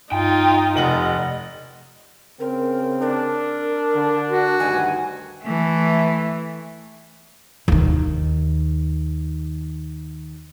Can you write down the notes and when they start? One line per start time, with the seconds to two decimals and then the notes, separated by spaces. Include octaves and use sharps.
0.12 G2 D#4 F4 G5
0.77 F1 C3 D#5 F#5 F#7
2.40 C#3 C4 A#4
3.01 D4 A#4
3.95 D3
4.30 F#4
4.60 D2 G2 D#3 G#5
5.43 E3 A3
7.68 D#2 D#3